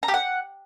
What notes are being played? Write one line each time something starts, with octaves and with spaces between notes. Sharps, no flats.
A#5
G4
F#5